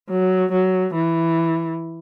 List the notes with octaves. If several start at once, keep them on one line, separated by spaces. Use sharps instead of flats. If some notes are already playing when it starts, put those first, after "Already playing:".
F#3
F#3
E3